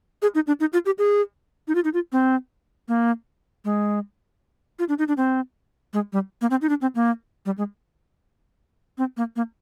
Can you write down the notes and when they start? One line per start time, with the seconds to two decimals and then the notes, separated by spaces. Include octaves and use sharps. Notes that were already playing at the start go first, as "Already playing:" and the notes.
0.22 G#4
0.35 D#4
0.47 D4
0.60 D#4
0.73 F4
0.86 G4
0.98 G#4
1.68 D#4
1.75 F4
1.84 D#4
1.94 F4
2.12 C4
2.88 A#3
3.65 G#3
4.79 F4
4.89 D4
4.99 D#4
5.08 D4
5.17 C4
5.93 G#3
6.13 G3
6.41 A#3
6.51 C4
6.62 D#4
6.69 D4
6.82 C4
6.95 A#3
7.46 G3
7.58 G#3
8.98 C4
9.17 A#3
9.36 A#3